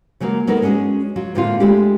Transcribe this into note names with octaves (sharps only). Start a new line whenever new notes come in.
C#3 F#3 G#3 A#3
F#3 B3 D#4 A4 A#4
G#3 C#4 D4 F#4 G#4
F#3 F4
A2 D3 G#3 A#3 C4 F4
G#3 A3 D4 F4 G4